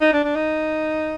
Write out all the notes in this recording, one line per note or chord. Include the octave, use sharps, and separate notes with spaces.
D#4
D4
D4
D#4